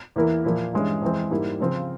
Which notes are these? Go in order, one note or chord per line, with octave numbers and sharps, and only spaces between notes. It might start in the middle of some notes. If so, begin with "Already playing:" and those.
E2 E3 A#3 E4 A#4
A#2 F3 A#3 E4
G2 E3 G#3 C#4
F2 E3 G#3 C4
G#2 G3 A#3 E4
C#3 F3 C4 F4